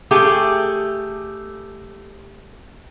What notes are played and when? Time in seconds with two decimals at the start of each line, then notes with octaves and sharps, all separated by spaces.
0.11 A3 G4 G#4